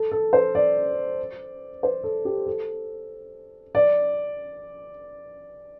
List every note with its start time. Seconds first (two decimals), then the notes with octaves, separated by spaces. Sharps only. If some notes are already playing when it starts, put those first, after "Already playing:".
Already playing: A4
0.12 A4
0.33 C5
0.55 D5
1.83 C5
2.04 A4
2.25 G4
2.46 A4
3.75 D5